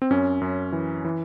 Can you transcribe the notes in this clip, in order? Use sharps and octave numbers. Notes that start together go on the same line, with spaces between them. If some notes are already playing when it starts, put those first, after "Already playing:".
C4
F#2 C#4
F#2
E3
E3